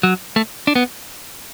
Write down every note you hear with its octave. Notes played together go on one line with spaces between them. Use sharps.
F#3
A3
D4
B3